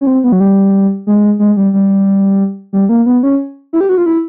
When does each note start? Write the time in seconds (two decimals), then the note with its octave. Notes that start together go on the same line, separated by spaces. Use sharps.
0.01 C#4
0.07 C4
0.24 B3
0.32 F#3
0.40 G3
1.07 G#3
1.39 G#3
1.57 G3
1.73 G3
2.73 G3
2.89 A#3
3.06 B3
3.23 C#4
3.73 E4
3.81 G4
3.89 F#4
3.98 F4
4.06 E4